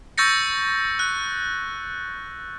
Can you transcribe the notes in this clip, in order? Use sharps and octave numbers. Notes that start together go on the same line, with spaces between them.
C#6 E6 G6 A6 A#6 C#7
F#6